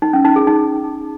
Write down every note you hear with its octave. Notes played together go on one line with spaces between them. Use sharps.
D#4
C#4
D#4
G#4
D#4